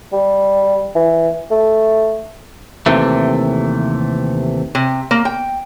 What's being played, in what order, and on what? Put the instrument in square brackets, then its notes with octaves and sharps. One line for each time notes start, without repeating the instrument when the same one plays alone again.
[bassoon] G3
E3
A3
[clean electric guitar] D#2 C3 E3 A3
[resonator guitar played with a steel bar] C3
A#3
G5